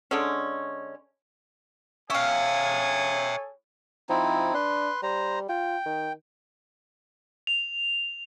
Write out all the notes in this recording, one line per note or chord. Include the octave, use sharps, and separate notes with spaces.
D3 G#3 C#4
C#4 G#4 A4 C#5 E5 F5 G5 G#5
F3 C4 D#4 E4
D4 B4 C6
G3 C5 A#5
F4 G5
D#3
F7